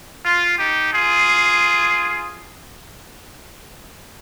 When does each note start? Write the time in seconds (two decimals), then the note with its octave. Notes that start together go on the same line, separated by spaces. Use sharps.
0.25 F4
0.58 D#4 G4
0.92 F4 G#4